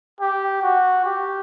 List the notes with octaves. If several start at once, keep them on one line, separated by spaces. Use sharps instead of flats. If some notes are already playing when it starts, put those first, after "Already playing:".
G4
F#4
G4